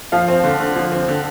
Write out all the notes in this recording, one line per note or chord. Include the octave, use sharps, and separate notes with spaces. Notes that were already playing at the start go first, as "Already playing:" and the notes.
F3 F5
C4
D3
D3
F3
C4
D3